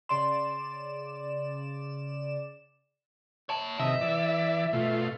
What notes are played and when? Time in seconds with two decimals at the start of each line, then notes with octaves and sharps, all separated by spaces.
0.09 C#3 D5 C6 E7
3.49 C#5 A5
3.79 C3 D#3 D#5 E5
4.01 E3 D5
4.73 B2 A3 F4